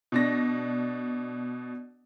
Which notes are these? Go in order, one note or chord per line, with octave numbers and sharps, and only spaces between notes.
B2 D4 A#6